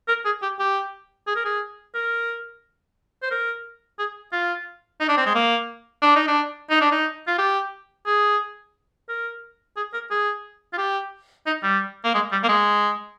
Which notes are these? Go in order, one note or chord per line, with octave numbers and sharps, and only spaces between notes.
A#4
G#4
G4
G4
G#4
A#4
G#4
A#4
C5
A#4
G#4
F4
D#4
D4
C4
G#3
A#3
D4
D#4
D4
D#4
D4
D#4
F4
G4
G#4
A#4
G#4
A#4
G#4
F4
G4
D#4
G3
A#3
G#3
G3
A#3
G#3